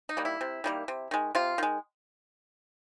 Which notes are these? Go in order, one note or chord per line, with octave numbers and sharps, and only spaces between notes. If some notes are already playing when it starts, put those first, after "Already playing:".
D#4
D#3 G3 A#3
E4
C3
D#3 G3 A#3
C3
D#3 G#3
C3 F4
D#3 G#3